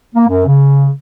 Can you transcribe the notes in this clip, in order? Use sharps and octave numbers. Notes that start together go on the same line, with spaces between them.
A#3
F#2
C#3